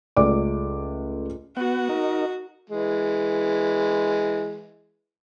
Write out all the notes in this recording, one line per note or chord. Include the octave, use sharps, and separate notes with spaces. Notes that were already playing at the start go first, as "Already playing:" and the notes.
C#2 A3 D5 D6
B3 F#4 F#5
D#4 A#4
E3 G#3